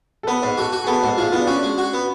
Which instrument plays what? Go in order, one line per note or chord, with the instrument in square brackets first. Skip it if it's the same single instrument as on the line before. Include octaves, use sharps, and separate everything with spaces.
[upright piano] A4
[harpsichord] B3 [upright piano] B4
[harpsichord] G#2
[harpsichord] F#4 [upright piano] A4
[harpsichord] F#4
[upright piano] G#4
[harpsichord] B3 [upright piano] A4
[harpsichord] G#2 [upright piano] F#4
[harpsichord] G#3 [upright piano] F4
[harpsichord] B3 [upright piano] F4
[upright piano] D4
[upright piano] C#4 [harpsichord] F#4
[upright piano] D4
[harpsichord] G#3
F#4
B3